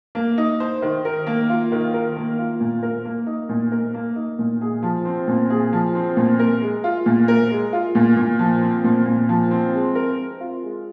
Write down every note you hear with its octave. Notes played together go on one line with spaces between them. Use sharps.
A#3
D#4
C5
D#3
A#4
A#3
F4
D#3
A#4
A#3
F4
A#2
A#4
A#3
D#4
A#2
A#4
A#3
D#4
A#2
G#4
F3
C4
A#2
G#4
F3
C4
A#2
A#4
G#3
F4
A#2
A#4
G#3
F4
A#2
A#2
F3
C4
A#2
A#2
F3
C4
G#3
A#4
C4
F4
G#3